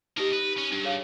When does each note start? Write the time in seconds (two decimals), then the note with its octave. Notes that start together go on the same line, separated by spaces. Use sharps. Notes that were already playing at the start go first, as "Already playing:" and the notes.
0.17 A#3 D#4 G4 D#5
0.33 B4
0.58 C#4
0.72 G2 D4
0.85 G#4 C#5 F5